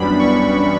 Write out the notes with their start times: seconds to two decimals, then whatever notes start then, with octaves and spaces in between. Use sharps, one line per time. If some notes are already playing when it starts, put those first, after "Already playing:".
Already playing: F#2 E3 G3 B3 D4 B5
0.19 C#6